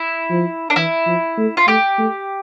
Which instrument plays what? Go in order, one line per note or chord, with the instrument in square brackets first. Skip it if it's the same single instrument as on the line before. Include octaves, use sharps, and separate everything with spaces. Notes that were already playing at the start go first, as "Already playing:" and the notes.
Already playing: [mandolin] E4
[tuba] F3
[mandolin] D4
[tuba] E3 [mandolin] E4
[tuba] F3
A3
[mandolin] F4
[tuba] A3 [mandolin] G4
[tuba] A3